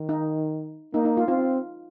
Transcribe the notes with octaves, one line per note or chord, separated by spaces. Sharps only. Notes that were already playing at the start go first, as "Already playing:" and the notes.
Already playing: D#3
D#4
A#3 D#4
D#4
F4
C4 F4